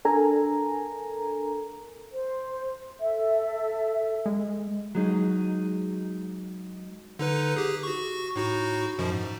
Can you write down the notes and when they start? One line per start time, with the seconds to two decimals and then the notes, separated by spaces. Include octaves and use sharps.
0.05 D4 A4 A#4 G#5 A#5
2.12 C5
3.00 A4 E5
4.26 G#3
4.95 F#3 G#3 D#4
7.19 D3 D#4 B4
7.56 G4 G#4
7.83 F#4 C#6
8.36 A2 D#4 F#4
8.99 F#2 B2 F3
9.12 G#2